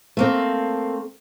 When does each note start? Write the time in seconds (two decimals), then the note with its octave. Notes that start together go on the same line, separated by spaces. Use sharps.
0.17 A3 A#3 C4